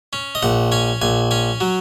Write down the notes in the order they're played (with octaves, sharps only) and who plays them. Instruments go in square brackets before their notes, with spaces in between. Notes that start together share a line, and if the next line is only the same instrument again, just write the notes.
[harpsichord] C#4
D#5
A#1 F#5
C#4 G#5
A#1 G#5
C#4 G#5
F#3